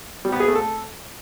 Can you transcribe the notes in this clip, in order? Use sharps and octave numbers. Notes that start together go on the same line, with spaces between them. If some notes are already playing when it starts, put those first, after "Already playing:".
G3
B3
G#4
A3
A4